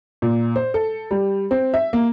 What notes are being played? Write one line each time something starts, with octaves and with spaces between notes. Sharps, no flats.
A#2
C5
A4
G3
C4
E5
A#3